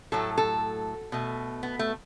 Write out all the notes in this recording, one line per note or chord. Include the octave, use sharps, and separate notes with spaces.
A2 F#3 A3 A4
A4
B2 A3
B3
A3